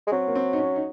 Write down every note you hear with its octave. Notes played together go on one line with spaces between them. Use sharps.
G#3
F#3 C4
A#3
C4
D#4
C#4
D#4